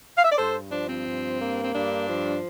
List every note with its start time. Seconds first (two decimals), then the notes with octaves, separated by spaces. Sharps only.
0.17 F5
0.25 E5
0.32 D5
0.38 G2 A4 C5
0.72 F3 D4
0.89 C4
1.06 G2
1.40 A#3
1.63 C4
1.74 G2 D4
2.08 F3